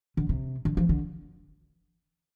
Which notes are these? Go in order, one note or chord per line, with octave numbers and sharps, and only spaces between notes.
D3
C3
D3
F3
D3